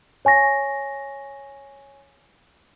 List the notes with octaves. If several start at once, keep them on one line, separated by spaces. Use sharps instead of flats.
C#5 G#5 C#6 A#6